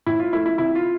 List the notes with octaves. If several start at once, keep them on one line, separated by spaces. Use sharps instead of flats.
A2 E4
F4
F3 A3 E4
E4
C3 E4
F4